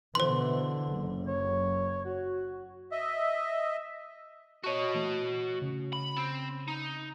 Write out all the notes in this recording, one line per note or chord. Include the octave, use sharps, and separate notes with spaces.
B2 D3 E3 C5 C6
F#1
C#5
F#4
D#5 E5
F#4 C#5 D#5 A5 C#6
E3 A3 C#5
C#3
B5
C4
D#4